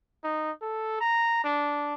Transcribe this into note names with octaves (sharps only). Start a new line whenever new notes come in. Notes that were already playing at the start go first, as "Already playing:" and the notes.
D#4
A4
A#5
D4